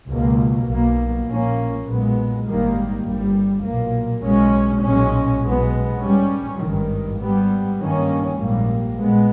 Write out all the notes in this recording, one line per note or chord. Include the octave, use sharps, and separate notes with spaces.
C#2 B2 A#3
B1 B2 A#3
A#1 A#2 A#3 C#4
B1 A#2 G#3 B3
G#1 G#2 D#3 G3 A#3
G1 G2 G3
B1 A#2 A#3
B1 B2 G#3 C#4
B1 A#2 G#3 C#4
B1 B2 G#3 B3
G#2 G3 C#4
G#1 G2 D#3
G#2 G3 B3
G2 D#3 A#3 C#4
A#1 G#2 G3 A#3
A#2 G#3 B3